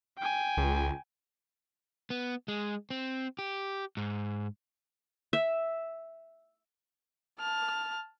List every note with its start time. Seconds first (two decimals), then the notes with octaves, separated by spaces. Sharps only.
0.18 G5 G#5
0.57 C#2
2.10 B3
2.48 G#3
2.90 C4
3.39 G4
3.97 G#2
5.33 E5
7.40 A5 F6